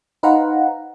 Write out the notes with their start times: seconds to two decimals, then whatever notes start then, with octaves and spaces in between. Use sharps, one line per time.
0.23 D#4 B4 C5 F5 F#5 A#5